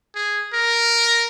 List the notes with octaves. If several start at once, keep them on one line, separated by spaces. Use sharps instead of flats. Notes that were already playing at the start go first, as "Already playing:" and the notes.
G#4
A#4